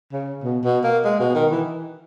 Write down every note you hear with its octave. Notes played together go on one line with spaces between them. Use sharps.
C#3
B2
B2
A#3
G#3
B2
D#3
E3